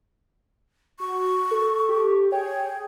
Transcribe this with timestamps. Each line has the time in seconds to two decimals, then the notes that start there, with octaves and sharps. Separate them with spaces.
1.00 F#4 C#6
1.51 A4
1.89 G4
2.32 G#4 C#5 G5